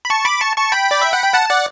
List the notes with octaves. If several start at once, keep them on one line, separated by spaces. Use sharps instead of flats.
B5
A5 C#6
B5 D6
A5 C#6
A5 C#6
G5 B5
D5
E5
F#5
G5
F#5 A5
D5 F#5